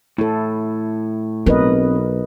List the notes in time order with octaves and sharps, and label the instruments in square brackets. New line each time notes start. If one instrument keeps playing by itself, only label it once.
[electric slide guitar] A2 [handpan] E4 A4
[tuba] B1 [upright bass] C4 [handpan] A#4 B4 D#5